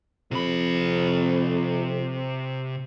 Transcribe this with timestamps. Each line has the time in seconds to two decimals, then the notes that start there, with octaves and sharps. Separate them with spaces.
0.31 F2 C3 B5